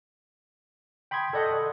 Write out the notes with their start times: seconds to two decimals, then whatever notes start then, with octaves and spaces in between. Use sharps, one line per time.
1.11 G5 B5 C6 D#6 G#6
1.33 A4 D5 D#5 F#5 C#6 G6
1.46 A4 D#6